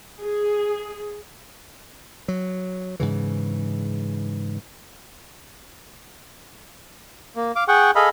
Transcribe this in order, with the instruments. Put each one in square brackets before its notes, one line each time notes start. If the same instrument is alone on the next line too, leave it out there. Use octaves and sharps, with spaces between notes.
[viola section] G#4
[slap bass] F#3
G#2 C#3 E3
[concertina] A#3
F5 D6
G#4 F#5 G5 C#6
G#4 A4 D#5 F5 B5